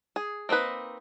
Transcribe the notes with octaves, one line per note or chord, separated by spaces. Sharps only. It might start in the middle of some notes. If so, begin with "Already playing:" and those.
G#4
A#3 C4 D#4 B4